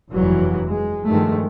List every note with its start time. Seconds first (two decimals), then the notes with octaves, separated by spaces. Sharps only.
0.11 F1 E2 G2 E3 F#3
0.68 G#3
1.05 G2 D#3 F3 G#3 A3